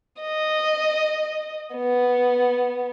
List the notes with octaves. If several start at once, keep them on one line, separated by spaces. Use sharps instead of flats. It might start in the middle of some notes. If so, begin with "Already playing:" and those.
D#5
B3